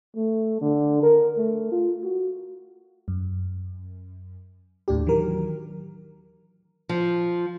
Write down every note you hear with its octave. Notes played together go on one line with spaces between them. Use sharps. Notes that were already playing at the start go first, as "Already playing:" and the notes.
A3
D3
A#4
A3
F4
F#4
F#2
D#2 A2 D4 G4
D#3 E3 F#3 A#4
F3